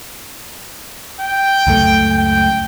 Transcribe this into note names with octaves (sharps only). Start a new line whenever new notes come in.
G5
C#2 F#2 A3
G5